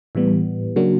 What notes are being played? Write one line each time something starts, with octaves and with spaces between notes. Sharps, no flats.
A2 E3 G3 B3
C#3 F#3 A#3 D4 F#4